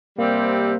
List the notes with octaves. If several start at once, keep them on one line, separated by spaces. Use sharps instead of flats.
C3 G3 A#3 C4